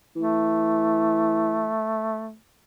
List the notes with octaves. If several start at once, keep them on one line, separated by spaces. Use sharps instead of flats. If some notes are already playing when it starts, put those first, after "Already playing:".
E3 A3